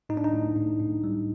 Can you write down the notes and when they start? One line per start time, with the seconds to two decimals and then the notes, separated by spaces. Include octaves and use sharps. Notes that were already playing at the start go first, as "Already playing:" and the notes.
0.09 A2 D#4
0.17 D4
0.24 D#4
0.33 A2
0.56 A2
0.79 A2
1.04 G3